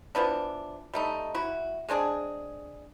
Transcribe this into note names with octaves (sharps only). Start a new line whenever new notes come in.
E3 F3 B3 D4
G3 A3 D#4
E4 F#4
G#3 C4 D4 G#4